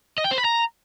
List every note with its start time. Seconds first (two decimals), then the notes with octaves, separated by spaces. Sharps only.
0.18 D#5
0.24 G5
0.31 C5
0.38 B5
0.45 A#5